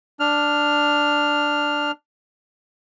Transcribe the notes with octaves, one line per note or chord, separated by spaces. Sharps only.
D4 F6